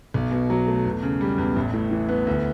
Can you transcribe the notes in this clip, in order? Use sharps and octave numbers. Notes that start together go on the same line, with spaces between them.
B1
B2
F#3
A3
E2
C#3
G3
E2
A1
A2
E3
B3
D2